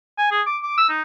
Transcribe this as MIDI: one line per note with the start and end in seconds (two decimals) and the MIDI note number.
0.18 0.27 80
0.31 0.41 68
0.46 0.57 86
0.63 0.74 86
0.78 0.89 88
0.89 1.02 63